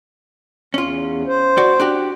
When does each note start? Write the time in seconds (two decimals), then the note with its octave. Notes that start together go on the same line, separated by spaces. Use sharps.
0.74 E2 C#4 F4
1.27 C5
1.57 F#4 D5
1.80 D4 F#4 G4